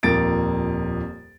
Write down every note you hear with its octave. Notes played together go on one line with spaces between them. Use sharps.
D#1 F2 A#3 A6 D7